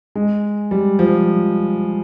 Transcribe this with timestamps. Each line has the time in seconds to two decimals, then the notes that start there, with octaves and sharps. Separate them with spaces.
0.15 G#3
0.71 G3
0.99 F3